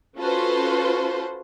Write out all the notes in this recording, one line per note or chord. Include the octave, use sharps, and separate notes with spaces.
C#4 F4 F#4 A4 B4 C5